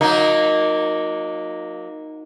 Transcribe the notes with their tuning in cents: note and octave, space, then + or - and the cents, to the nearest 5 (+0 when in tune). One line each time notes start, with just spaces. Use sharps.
F#3 -30 A#3 +0 D#4 +0